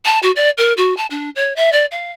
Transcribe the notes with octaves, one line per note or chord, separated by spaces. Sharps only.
A5
F#4
D5
A#4
F#4
A5
D4
C#5
E5
D5
F5